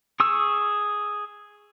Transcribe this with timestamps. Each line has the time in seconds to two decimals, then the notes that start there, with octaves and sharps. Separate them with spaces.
0.20 G#4 C#6 E6